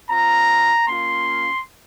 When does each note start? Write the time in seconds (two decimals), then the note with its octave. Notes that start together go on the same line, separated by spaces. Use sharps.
0.10 C4 F4 A#5
0.87 A#3 C#4 F4 C6